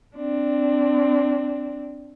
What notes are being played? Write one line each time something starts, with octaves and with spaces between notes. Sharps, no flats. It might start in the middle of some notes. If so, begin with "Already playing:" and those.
C4 D4